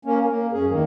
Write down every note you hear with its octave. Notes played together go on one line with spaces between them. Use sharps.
A#3 C#4
A#3
F#2 C#4 G#4
E2 D#3 A#3